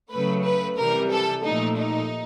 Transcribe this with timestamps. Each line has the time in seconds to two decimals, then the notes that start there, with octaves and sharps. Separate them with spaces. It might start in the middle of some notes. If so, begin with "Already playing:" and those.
0.10 C#3 F#3 A3 B4
0.44 B4
0.77 C3 E3 G3 A#4
1.11 A4
1.44 A#2 F3 A3 D#4
1.77 D#4